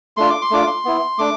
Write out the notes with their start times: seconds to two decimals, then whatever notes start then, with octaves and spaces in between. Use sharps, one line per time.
0.17 A3 D4 F4 C6
0.30 D6
0.42 C6
0.50 A3 D4 F4 D6
0.67 C6
0.85 B3 E4
1.18 A3 D4 D6